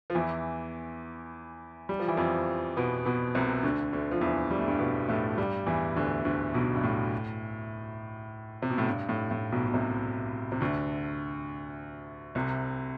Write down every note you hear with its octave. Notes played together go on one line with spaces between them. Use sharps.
F3
E2 E3
G3
F3
E3
F2 F3
B2 B3
B2 B3
C2 C3
D2 D3
D2 D3
F3
E2 E3
G3
A3
G2 G3
B2 B3
A2 A3
G2 G3
E2 E3
D2 D3
D2 D3
B1 B2
G2
A2
C3
B2
A2
G2
A2
A2
B1 B2
B2
C2 C3
C3
D2 D3
C2 C3